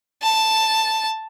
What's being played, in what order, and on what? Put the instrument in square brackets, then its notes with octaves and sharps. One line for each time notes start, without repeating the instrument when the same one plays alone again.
[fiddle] A5